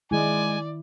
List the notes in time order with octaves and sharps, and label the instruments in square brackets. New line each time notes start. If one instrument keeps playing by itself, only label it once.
[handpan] D#3 E4 [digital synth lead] G#3 [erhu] D5 [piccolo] G#5